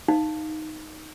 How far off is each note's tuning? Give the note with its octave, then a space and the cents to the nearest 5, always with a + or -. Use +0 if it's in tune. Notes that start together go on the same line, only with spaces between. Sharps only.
D#4 +0 F5 +0